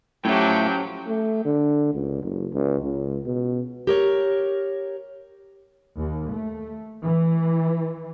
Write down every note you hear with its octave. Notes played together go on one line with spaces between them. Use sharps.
A2 F3 F#3 A3 C#4 G4 G5
A3
D3
C#2
F#1
C#2
C#2
B2
G4 A#4 C#5
D#2
A3
E3